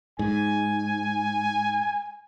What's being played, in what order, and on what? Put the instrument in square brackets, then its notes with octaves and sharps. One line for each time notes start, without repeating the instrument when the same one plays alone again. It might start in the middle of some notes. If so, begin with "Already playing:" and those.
[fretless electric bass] G#2 [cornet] G#5